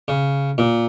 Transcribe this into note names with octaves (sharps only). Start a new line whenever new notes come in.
C#3
A#2